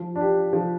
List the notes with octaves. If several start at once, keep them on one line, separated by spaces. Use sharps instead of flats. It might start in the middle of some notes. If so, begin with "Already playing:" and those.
Already playing: F3
D4 G4
F3